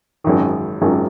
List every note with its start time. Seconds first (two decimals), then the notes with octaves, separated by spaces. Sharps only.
0.24 G#1 F#2 D#3
0.81 G#1 F#2 D#3